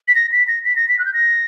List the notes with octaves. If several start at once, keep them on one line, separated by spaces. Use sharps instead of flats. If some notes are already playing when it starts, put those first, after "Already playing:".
B6
A#6
B6
A#6
B6
A#6
B6
F#6
G6
A#6